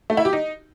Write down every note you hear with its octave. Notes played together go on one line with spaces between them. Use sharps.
A3
E4
G4
D#4